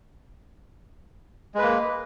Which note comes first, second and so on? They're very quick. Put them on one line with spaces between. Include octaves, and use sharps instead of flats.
G#3 B4 A#3